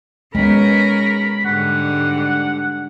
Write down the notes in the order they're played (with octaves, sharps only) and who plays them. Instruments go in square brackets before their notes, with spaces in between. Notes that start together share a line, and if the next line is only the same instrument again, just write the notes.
[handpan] G#3 B3 [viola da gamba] C#4 A#4 [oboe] B5
[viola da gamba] G#2 D3 G3 [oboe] F#5